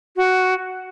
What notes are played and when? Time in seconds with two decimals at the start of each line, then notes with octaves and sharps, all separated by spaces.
0.16 F#4